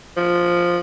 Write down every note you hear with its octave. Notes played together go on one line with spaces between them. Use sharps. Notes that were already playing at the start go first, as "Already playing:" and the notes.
F3